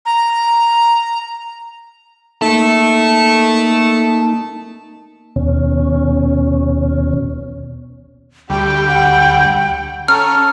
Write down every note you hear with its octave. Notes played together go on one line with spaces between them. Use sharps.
A#5
A3 A#3 D#4 A5
D#2 B2 C#4
D2 G3 G4 G5
F#5
C#4 A4 A#5 F6